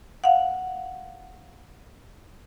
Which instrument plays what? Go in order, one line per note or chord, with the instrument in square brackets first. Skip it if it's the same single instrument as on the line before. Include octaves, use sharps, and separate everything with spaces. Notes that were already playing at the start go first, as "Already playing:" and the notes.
[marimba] F5 F#5